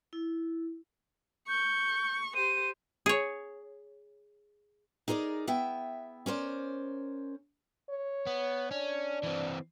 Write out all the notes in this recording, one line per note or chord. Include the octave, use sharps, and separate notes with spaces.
E4
C#6 G6
G4 C5 D#7
G#4 C#5
D#4 G#4 A#4 C5 D5
B3 E4 E5 G5
C#4 A#4 C5 D5
C#5
B3
C#4 D4
E3 C4